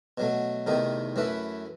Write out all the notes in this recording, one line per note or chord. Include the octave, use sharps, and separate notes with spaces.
B2 F#3 A3
E2 C3 D#3 A3 D#4
F#2 E3 A3 E4 B4